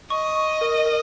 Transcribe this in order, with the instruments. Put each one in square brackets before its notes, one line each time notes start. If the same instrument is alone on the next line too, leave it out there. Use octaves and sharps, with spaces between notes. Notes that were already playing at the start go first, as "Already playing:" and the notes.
[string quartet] D#5 [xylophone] C#6
[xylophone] C#6
A#4
A#4